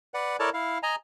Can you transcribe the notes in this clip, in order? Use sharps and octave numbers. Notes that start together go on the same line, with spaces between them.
B4 D5 F#5
E4 A4 A#4 C#5 D5 A5
E4 F5
D#5 G#5 A#5